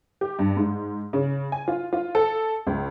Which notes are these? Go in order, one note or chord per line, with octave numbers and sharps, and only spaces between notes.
G4
G2
G#2
C#3
G#5
F4
F4
A4
C#2